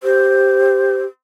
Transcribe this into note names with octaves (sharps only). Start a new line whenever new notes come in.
G4 C5